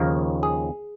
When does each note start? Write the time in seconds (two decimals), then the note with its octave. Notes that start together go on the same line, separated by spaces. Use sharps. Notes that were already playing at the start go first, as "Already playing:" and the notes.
Already playing: D#2 C#3 F3 A#3 A#4
0.43 G#4